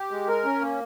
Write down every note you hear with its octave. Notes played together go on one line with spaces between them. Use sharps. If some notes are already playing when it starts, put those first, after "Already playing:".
Already playing: G4
G#3
A#4
C#4
A#3